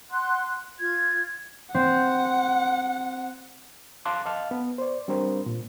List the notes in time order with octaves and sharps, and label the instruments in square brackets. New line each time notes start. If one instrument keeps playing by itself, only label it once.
[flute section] F#5 C6 F#6
F4 G#6
[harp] C4 [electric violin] F#5
[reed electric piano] F5 A5 C6 D6 F#6
D#5 F5 A5 F6
B3
C5 D5
G3 C4 D4 G4 A#4 C5
A#2